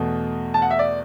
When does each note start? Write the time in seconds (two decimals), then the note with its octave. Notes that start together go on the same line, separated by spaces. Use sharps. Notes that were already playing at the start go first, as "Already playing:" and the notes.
Already playing: E2 B2 A3
0.54 A5
0.62 F#5
0.71 E5
0.79 D5